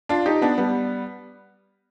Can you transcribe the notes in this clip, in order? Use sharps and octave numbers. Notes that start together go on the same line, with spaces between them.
D4 F4
D#4 G4
B3 D4
G3 B3